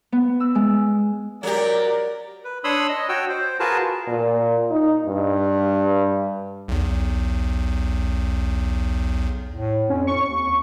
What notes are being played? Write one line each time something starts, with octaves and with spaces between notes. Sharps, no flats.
B3
E6
G#3
F#3 G4 A#4 D5
B4
D4 C#5 B5 C6 D#6 E6
D#5
F#4 C#5 G5 E6
C5
F4 F#4 G#4 A#4 B4 A5
A#2
D#4
G2
B1 E2
A2
F2 C#4
C#6
D#2